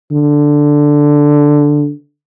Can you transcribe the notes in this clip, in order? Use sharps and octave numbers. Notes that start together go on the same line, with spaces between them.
D3